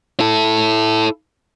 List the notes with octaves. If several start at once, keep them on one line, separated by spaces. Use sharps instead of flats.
E4 A4